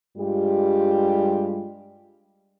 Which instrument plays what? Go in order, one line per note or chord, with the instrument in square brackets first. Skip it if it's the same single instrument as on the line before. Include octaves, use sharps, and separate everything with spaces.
[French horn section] G2 G3 G#3 F4 G4